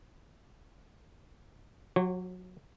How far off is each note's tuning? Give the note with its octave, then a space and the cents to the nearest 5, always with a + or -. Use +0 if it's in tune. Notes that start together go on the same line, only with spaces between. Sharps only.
F#3 -25 F#4 +40 C#5 -35